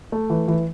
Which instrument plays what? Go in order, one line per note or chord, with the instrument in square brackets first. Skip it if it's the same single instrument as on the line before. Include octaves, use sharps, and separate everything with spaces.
[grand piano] A3
E3
E3